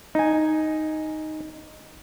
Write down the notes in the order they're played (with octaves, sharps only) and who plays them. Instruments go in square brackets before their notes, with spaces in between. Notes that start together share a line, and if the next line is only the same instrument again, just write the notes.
[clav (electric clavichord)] D#4 G#5